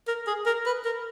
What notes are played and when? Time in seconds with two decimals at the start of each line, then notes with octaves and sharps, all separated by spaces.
0.08 A#4
0.27 G#4
0.46 A#4
0.66 B4
0.85 A#4